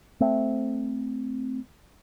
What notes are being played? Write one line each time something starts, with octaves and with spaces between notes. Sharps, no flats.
A3 C4